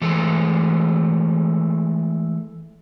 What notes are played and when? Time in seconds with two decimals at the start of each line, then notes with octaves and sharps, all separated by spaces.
0.02 E3 G#3 A3 A4